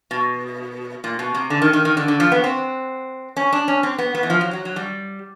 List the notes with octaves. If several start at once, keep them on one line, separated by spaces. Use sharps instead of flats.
B2
A#2
B2
C3
D3
D#3
D#3
D#3
D3
D3
F3
B3
C4
C#4
D4
C#4
C4
B3
B3
E3
F3
F#3
F#3
F#3
G3